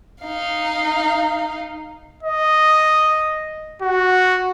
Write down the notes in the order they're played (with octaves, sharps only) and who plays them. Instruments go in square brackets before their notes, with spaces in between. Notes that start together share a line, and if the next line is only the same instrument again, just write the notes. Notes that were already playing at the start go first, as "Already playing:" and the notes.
[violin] D#4 F5
[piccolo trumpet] D#5
F#4